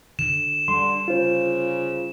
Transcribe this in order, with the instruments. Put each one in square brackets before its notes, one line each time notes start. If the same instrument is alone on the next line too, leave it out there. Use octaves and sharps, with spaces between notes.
[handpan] D3 [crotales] E7
[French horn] D3 [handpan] G3 [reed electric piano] C6
[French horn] C#3 [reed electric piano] F4 C5